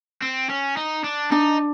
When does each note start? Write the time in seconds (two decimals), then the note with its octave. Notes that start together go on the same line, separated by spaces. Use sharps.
0.22 C4
0.50 C#4
0.77 D#4
1.04 D4
1.32 D4 D#4